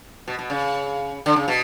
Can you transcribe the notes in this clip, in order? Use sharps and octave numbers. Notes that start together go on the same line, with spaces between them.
B2
B2
C#3
D3
C#3
B2